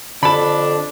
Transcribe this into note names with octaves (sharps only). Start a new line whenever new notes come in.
F2 D3 D4 A4 B5